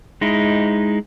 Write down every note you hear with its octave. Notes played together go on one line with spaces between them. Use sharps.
G#3 D#4 E4